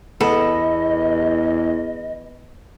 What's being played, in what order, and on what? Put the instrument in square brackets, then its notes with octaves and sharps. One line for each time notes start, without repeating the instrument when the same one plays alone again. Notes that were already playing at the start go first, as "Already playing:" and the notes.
[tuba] E2 [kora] B3 [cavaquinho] A4 [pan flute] D#5